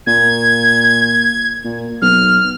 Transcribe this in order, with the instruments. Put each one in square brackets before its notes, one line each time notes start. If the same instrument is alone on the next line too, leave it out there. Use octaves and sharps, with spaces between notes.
[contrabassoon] A#2 [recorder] G#6
[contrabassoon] A#2
[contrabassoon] B1 [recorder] F6